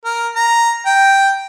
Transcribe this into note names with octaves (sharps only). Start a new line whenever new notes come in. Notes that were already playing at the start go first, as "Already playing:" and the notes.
A#4
A#5
G5